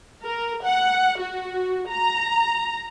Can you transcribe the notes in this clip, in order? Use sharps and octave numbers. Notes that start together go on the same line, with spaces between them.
A#4
F#5
F#4
A#5